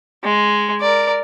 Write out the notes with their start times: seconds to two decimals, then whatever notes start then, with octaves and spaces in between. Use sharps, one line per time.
0.24 G#3
0.81 A#4 D5